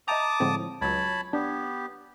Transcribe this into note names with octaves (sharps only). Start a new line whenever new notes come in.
D#5 E5 G5 A5 A#5 D6 D#6
A2 D3 F3 G#3 C4
C#2 F#3 C#5 A5 B5
B3 D4 G4